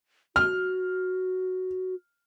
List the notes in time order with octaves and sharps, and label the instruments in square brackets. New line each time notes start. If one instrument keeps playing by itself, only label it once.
[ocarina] F#4 [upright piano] F6